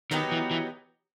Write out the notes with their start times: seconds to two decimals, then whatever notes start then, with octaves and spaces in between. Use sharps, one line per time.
0.11 D#3 F#3 B3 D#4 G4
0.32 E3
0.51 E3